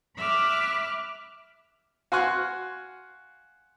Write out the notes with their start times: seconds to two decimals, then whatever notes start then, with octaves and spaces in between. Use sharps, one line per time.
0.17 E5 B5 D6 F6 F#6
2.12 F#4 F5 G#5 C6 C#6 F#6